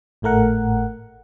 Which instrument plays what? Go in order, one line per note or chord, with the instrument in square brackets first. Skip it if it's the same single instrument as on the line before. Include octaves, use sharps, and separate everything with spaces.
[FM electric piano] G#1 A2 A3 A#4 F#5